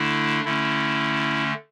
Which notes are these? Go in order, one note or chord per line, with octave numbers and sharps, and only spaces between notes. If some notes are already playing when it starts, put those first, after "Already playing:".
Already playing: D3 A3 D4 E4
D3 A3 C#4 E4